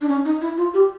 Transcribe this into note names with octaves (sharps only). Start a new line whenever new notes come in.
D4
C#4
D#4
E4
F4
G4